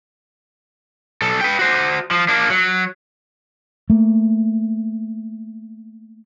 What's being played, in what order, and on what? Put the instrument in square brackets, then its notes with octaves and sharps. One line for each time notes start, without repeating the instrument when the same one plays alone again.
[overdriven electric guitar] B1 A4
B4 G5
F#4 C5
F3
A#3 D4
F#3
[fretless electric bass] A3 A#3